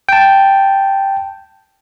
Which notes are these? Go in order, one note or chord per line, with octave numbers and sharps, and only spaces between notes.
G5 A5